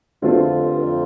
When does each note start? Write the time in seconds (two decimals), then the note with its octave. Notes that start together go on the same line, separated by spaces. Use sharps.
0.22 E2 D3 A3 C4 F4
0.41 F2
0.60 G2
0.79 F2